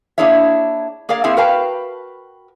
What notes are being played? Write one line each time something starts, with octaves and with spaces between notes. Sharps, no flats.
A#3 D4 E4 G#4 C#5 E5
A#3 G#4 A#4 D5 F5
A#3 C4 E4 G#4 E5 F5
F#4 A#4 B4 F5 G5 A5